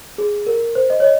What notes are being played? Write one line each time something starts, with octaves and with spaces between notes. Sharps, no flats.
G#4
A#4
C5
D#5
C#5
D#5